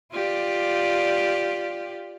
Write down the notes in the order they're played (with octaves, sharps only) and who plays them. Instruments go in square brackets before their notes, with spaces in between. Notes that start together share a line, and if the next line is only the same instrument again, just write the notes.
[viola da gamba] F4 G4 D5